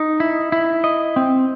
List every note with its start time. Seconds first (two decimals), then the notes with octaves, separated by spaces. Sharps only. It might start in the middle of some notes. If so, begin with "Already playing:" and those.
Already playing: D#4
0.20 E4
0.52 E4
0.84 D#5
1.16 C4